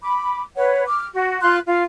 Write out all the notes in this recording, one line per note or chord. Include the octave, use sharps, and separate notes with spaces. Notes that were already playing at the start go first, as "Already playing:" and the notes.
B5 D6
B4 C#5 F#5
D6 F6
F#4
F4 C6 F#6
F4